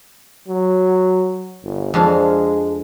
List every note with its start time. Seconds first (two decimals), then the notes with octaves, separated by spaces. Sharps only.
0.47 F#3
1.64 G1
1.94 F2 G#3 D4 F5